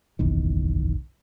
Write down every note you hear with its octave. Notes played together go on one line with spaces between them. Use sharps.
F#1 B1 E2 D#3